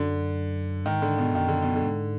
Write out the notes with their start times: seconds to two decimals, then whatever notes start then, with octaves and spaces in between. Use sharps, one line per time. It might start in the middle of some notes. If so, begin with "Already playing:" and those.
Already playing: F#2 D3
0.85 G#2 D#3
1.02 D3
1.18 B2
1.34 F#2 D#3
1.48 D3
1.62 B2
1.76 D3
1.84 G#2